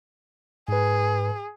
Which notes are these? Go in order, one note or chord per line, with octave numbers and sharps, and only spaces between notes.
G#2 G#4 B4